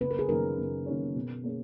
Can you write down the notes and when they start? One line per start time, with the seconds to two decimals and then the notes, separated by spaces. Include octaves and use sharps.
0.01 F#1 B4
0.11 A#4
0.19 G#4
0.29 F#2 D#3 A#3 C#4 A#4
0.58 F#1
0.86 F#2 D#3 A#3 C#4
1.15 B2
1.44 A#3 C#4 G#4